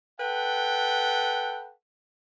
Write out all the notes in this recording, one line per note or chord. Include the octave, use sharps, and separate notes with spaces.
A4 B4 F#5 G5